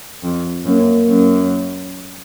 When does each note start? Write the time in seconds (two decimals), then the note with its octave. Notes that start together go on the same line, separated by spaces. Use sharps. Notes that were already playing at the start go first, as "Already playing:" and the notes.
0.23 F2
0.66 F#2 A#3
1.09 F#2